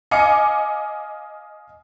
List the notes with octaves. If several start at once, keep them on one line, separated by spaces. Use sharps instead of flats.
D#5 F5 G#5 D6 C#7